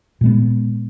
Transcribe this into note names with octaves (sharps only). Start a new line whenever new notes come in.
A#2 G#3 B3